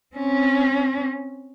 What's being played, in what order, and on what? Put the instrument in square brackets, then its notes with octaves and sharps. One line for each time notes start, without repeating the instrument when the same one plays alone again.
[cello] C4 C#4